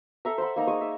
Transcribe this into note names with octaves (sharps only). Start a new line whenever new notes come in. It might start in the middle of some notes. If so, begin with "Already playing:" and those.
A4 E5 A#5
C5 F#5 B5
A#3 D#4 A#5
G#3 C#6 D#6
E5